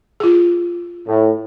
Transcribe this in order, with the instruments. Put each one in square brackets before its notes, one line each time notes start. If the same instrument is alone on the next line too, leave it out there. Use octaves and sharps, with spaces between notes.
[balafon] F4 G#4
[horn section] A2